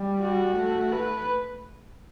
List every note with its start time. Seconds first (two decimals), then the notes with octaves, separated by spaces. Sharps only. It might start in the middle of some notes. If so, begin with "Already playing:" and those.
Already playing: G3
0.20 F#4
0.56 A3
0.92 B4